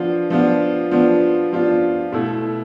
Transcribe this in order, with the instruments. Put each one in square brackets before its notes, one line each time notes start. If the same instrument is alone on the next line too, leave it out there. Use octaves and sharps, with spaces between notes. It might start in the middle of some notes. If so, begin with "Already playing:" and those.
Already playing: [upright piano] F3 B3 D4 F4
F3 B3 D4 F4
F3 B3 D4 F4
F3 B3 D4 F4
B2 A3 E4